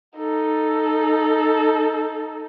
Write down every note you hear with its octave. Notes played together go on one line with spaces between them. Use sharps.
D#4 A4